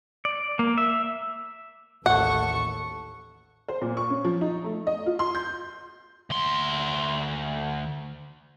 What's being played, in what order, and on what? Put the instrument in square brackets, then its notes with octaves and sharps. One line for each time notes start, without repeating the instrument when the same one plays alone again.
[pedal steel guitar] D5
A#3
E5
[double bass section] A1 D#2 [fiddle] A4 C#6 [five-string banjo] F#5
[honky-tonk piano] C5
A#2
C#6
C#4
F3
D#4
A3
D#5
F4
C6
G6
[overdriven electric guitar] D2 C6